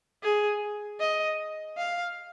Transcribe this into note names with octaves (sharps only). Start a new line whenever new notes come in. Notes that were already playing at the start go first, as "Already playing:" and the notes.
G#4
D#5
F5